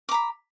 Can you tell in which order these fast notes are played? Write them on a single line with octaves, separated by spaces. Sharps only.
D6 A#5 B5